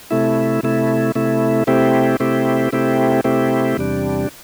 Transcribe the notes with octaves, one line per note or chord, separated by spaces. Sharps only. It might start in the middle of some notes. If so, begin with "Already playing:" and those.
C3 A3 E4
C3 A3 E4
C3 A3 E4
C3 A3 C4 E4 G4
C3 A3 C4 E4 G4
C3 A3 C4 E4 G4
C3 A3 C4 E4 G4
E2 C3 G3 D4